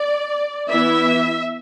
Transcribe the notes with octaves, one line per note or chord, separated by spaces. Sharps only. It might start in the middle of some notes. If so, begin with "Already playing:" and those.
Already playing: D5
E3 B3 E4 E5